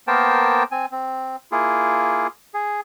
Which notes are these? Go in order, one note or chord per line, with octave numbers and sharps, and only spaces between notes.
A#3 B3 A#4 C5 G5 A5
C4 G#5
C4
A#3 E4 F4 G#4
G#4